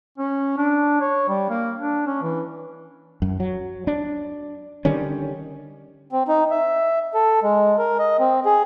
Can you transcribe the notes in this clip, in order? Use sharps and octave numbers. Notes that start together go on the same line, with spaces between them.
C#4
D4
C#5
G3
A#3
D4
C#4
E3
F#2
F#3
D4
D3 D#3 G3 C#4
C4
D#4
E5
A4
G#3
A#4
D#5
C4
G#4